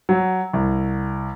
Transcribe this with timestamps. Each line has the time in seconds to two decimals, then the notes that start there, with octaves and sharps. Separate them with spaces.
0.09 F#3
0.53 C2